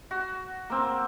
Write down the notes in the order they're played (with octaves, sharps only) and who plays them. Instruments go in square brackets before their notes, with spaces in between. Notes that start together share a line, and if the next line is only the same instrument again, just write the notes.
[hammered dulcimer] F#4
A#3 C4